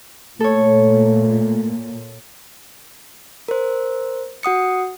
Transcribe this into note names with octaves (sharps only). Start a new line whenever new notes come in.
A#2 A3 A4 C#5
A#4 C5
F#4 F#5 D#6 C#7